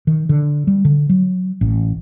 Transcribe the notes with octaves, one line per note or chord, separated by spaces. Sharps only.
D#3
D3
G3
D3
F#3
A1